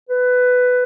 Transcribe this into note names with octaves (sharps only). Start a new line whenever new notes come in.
B4